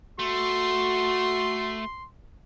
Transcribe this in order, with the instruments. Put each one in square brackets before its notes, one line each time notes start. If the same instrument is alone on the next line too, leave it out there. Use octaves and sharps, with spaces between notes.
[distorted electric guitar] A3 [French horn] F#4 [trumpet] C6